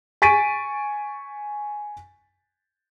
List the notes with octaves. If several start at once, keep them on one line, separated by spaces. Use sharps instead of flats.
G#5 C#6 A6 B6 D7 D#7